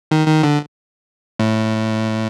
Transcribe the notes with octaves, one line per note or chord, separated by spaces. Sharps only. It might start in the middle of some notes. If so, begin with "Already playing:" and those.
D#3
D#3
D3
A2